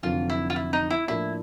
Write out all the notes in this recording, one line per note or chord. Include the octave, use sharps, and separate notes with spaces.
F1 F2 D3 F#3 F4
E4
F4
E4
D#4
E4
A2 F3 A#3 D4 E4